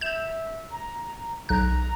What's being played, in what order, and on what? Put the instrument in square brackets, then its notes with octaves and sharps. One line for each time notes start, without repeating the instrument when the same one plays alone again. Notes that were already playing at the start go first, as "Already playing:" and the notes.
[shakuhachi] E5 [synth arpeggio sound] G6 E7
[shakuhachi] A#5
[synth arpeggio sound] B1 F#6 [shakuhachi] A#5